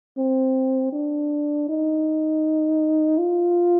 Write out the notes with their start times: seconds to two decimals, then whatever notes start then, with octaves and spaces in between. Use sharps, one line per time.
0.18 C4
0.92 D4
1.69 D#4
3.18 F4